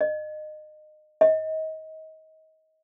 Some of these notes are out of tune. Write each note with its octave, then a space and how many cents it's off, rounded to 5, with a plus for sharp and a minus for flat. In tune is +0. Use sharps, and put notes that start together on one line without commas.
D#5 -30
D#5 +30